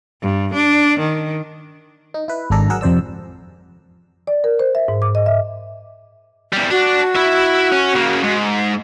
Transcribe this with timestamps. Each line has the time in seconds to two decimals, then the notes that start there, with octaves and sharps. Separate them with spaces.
0.22 G2
0.54 D4
0.99 D#3
2.14 D#4
2.28 E4 B4
2.50 G#1 G#3 D4 A4 A#5
2.69 F#3 G#4 A#4 F#5 E6
2.81 F2 C3 C5 D5 E6
4.27 D5
4.44 A#4
4.59 C5
4.75 E5
4.88 G#2
5.02 D6
5.15 D#5
5.26 E5
6.53 E2 G3
6.71 D4 F#4
7.16 E4 E5
7.72 C#4
7.95 C#3 A#3
8.23 G#2